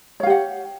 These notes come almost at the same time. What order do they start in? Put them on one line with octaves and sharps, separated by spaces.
C#5 F5 G4 F#5